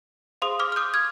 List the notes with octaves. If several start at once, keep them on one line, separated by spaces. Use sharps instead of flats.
G#4 C5 F5 C6 D#6
D6 F6
F6
D#6 G6
F6 G#6